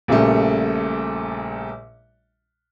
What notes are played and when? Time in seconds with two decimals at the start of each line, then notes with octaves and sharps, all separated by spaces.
0.08 A#1 A#2 C#3 G3 A3